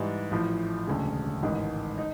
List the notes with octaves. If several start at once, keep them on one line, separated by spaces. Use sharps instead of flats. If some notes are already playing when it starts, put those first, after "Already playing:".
Already playing: G#2 E3 G3
A1 A2 F3
E1 D2 C#3
A1 G#2 D#3
D#4